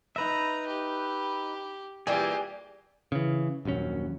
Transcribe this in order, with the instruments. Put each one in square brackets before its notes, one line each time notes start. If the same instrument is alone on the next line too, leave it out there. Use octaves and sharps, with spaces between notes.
[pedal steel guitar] D#4 B4 E5 [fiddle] A#5
[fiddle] G4
[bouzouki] E3 G3 A#3 [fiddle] F4 G4 [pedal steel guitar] G#4 G#5
[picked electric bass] C#3 E3
D#1 A#1 F#2 C#4